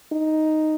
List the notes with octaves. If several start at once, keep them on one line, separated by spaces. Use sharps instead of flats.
D#4